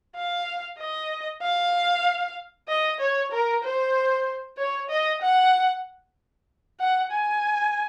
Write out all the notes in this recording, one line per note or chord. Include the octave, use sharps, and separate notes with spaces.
F5
D#5
F5
D#5
C#5
A#4
C5
C#5
D#5
F#5
F#5
G#5